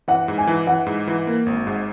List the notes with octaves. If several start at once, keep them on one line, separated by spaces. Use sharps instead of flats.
E3 F#5
G#2
G#5
E3
E3 F#5
G#2
E3
A#3
G#1
G#2